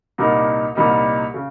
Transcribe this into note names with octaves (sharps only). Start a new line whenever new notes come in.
C2 A#2 G3 A#3 D#4
C2 A#2 G3 A#3 D#4
C#3